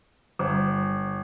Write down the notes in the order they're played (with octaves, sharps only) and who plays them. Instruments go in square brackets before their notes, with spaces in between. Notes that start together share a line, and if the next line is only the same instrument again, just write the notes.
[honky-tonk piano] G1